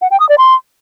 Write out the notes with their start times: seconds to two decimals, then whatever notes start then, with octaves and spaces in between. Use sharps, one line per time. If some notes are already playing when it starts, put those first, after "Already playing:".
0.02 F#5
0.11 G5
0.20 D#6
0.29 D5
0.38 C6